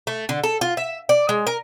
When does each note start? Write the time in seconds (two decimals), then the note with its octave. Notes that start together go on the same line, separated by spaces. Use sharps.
0.07 A3
0.29 D3
0.43 A4
0.61 F4
0.77 E5
1.09 D5
1.29 G#3
1.47 A#4